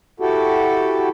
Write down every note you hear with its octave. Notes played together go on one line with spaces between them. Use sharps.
E4 F#4 G4 A4